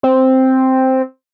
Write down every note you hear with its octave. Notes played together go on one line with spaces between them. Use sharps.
C4